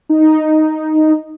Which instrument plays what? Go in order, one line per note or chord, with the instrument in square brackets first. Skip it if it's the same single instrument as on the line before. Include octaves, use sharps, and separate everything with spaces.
[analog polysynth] D#4